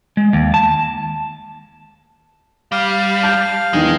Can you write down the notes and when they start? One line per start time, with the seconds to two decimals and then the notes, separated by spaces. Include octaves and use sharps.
0.17 G#3
0.33 D#2
0.54 A5
2.72 G3 F5
3.23 A5 G6
3.73 E2 D#3 G#3